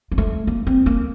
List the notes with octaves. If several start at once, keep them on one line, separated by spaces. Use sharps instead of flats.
A#3
A3
A#3
C4
A#3